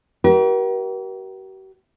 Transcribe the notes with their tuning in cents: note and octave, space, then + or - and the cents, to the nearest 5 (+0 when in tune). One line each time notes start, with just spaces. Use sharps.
G4 -45 A#4 +40 E5 +10